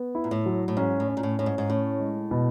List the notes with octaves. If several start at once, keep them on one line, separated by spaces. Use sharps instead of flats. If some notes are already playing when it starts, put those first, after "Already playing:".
Already playing: B3
E4
A#2
A2
F#3
A2
G#2 C#4
A2
C#4
A#2
A2
A2 C#4
G#2
G#2
A2 C#4
G#3
B2